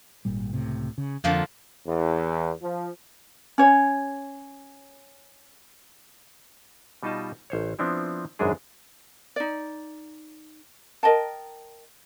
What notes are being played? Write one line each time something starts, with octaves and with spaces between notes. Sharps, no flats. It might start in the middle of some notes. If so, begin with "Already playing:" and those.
G#1 A#2 G3
C#2 A2 C3
C#3
F2 D3 F3 A#3
E2
F3
C#4 C#5
B2 G3 D#4 F4 D#5 A5
A1 C5 C#5
F3 B3 C4 D4 E4
G#1 F#2 B2 G#3 D4 G#4
D#4 D5
A#4 D#5 G5 A5